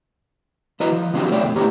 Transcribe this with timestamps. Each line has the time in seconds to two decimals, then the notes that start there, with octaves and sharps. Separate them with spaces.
0.80 E2 E4 F#4 B4 D#5 A#5
0.92 F3
1.14 F3 F#3 C4 D4 F#4 G4
1.31 B1 A3 C#5 D5 E5 G5
1.42 F2 B2 A3
1.56 A2 B3 G4 A#5